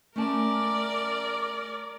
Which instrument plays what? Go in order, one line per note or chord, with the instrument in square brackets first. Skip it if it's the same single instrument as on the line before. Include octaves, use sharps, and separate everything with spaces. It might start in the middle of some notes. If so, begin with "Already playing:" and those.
[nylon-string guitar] A3 C#4 A5 [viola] A#4 D5